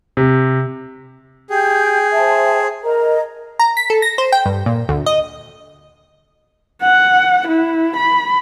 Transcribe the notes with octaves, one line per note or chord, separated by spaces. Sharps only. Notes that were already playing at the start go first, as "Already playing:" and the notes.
C3
G4 G#4 G5 G6
C5 E5 G5 A5
A#4 D#5 A#5
A#5
B6
A4
A#6
C5
G5
G2
A#2
D2
D#5
F#5
E4
B5